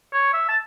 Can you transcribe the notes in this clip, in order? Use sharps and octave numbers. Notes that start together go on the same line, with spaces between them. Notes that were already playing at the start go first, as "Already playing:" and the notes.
C#5
E5
A5